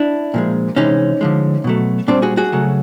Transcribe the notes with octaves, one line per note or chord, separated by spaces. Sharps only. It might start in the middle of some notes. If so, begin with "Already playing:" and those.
Already playing: D4 E4
A#2 F3 G#3
C3 E3 G#3 C#4 D#4
D3 F3 G#3
B2 F#3 A3
A#2 G3 C4 D4
F#4 G#4
F#4 G#4
C#3 F#3 A3